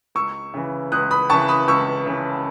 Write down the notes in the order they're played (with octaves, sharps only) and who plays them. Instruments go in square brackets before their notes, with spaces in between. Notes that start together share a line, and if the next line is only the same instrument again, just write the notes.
[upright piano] C#2 C#6 E6
C#3 E3
C#2 D#6 F#6
B5 D#6
C#3 E3 A5 C#6
B5 D#6
C#2 C#6 E6
C#3 E3